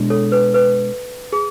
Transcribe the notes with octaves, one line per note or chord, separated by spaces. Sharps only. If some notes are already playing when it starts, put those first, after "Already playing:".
Already playing: B2 G#3 D4
A4 C#5
B4
B4
G#4